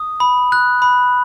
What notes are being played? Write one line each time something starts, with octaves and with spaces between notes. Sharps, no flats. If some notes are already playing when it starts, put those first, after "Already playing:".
Already playing: D#6
B5
F#6
B5